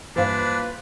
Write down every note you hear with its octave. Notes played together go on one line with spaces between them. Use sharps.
G2 E3 F3 A#3 D4 B4 C5 F5